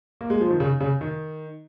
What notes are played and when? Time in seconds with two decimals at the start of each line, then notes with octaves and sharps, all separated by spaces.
0.21 A#3
0.30 G#3
0.41 F3
0.50 D#3
0.60 C#3
0.80 C#3
1.01 D#3